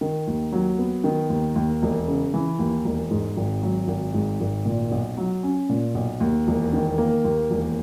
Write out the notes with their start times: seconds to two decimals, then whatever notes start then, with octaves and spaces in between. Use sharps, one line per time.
0.01 D#3
0.27 D#2
0.52 F#3
0.78 B3
1.04 D#3
1.30 D#2
1.56 D#2
1.82 E1
2.07 C#3
2.34 E3
2.59 D#2
2.85 E1
3.10 G#2
3.37 G#1
3.62 F#3
3.88 G#1
4.14 G#2
4.40 G#1
4.66 A#2
4.91 B1
5.17 F#3
5.43 C#4
5.69 A#2
5.95 B1
6.20 D#2
6.47 E1
6.73 D#3
6.98 A#3
7.25 D#2
7.50 E1